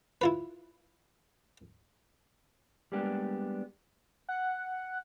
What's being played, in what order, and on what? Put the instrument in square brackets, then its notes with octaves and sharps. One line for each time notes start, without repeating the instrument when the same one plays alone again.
[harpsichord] E4 F4 B4
[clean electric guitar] G3 G#3 A#3 B3 D4 G4
[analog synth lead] F#5